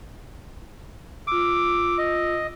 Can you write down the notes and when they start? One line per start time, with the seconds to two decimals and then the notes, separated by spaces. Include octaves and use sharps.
1.27 F4 D6 E6
1.98 D#5